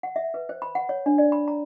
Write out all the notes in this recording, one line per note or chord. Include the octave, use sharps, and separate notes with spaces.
F#5
E5
B4
C5
B5
F#5
C#5
D4
D5
B5
A#5